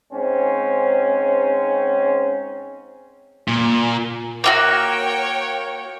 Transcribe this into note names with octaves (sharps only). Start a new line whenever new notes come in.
G#2 C4 C#4
A#2
A#3 F4 F#4 C#5 G5